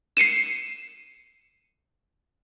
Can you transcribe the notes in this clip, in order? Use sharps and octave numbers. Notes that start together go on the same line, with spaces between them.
C7 C#7 D#7 E7